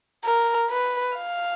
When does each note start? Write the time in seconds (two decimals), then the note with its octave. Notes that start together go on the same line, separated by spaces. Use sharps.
0.25 A#4
0.70 B4
1.16 F5